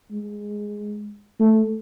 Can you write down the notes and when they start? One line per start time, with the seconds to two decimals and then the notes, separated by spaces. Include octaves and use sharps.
0.11 G#3
1.39 A3